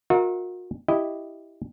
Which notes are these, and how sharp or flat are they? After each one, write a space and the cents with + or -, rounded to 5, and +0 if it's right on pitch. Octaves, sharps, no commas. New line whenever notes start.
F#4 -40 A#4 +0 E5 -35
E4 +0 G4 +0 D#5 +0